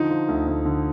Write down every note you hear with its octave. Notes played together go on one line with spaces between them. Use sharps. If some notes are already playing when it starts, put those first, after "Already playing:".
Already playing: D3 F3 D#4
F3
D2
D2
D3